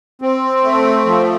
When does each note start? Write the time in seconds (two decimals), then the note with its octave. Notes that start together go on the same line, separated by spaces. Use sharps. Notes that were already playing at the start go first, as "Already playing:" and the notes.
0.22 C4
0.64 A3
1.05 F3